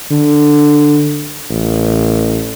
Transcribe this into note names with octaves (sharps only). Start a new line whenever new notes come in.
D3
A1